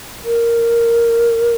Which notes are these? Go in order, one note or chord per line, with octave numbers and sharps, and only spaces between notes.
A#4